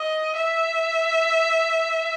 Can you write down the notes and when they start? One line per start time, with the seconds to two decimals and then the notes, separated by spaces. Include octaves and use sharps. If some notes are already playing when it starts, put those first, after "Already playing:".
Already playing: D#5
0.38 E5